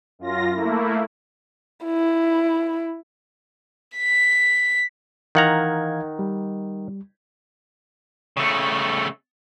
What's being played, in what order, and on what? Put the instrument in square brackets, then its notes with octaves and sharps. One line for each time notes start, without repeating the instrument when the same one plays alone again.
[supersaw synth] F#2 F4 A#6
A3 A#3 E4
[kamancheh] E4
[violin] B6
[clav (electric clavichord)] D#3 F#5 A#5 [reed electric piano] E3 F5 G#6
[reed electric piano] G3
[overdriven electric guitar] C#3 A3